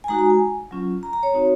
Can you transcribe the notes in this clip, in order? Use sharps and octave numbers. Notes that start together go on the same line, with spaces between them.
G#5
G#3 D#4 F#4 A#5
A#5
G#5
F#3 C#4 F4
A#5
A#5
C#5
C4 D#4 F#4